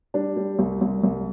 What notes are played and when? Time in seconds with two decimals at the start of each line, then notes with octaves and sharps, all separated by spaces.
0.14 G3 D4
0.36 G3
0.59 C2
0.81 C2
1.03 C2